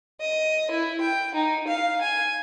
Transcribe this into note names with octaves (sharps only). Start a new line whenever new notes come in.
D#5
E4
G5
D#4
F5
G#5